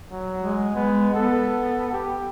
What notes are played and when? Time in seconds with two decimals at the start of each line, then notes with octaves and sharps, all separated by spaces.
0.11 F#3
0.42 G#3
0.75 G#3 B3
1.14 B3 A4
1.93 G4